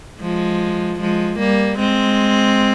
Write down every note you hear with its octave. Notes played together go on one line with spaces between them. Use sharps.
F3 G#3
F3 G#3
G3 A#3
G#3 C4